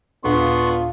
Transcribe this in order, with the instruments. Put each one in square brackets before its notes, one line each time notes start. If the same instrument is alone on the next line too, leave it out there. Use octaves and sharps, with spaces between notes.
[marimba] D#2 A#2 D4 [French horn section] D3 F4 [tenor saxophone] B3 [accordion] C6 C#6